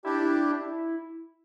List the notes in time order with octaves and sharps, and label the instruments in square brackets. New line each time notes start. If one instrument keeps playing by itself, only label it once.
[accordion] D4 G4 [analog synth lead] E4
[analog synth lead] E4